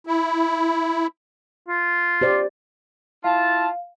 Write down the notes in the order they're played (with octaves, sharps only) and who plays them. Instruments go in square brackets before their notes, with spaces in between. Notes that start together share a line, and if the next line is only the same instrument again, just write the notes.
[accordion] E4
[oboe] F4
[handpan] G4 C5 D5
[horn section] E4 F4 A5 [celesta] F5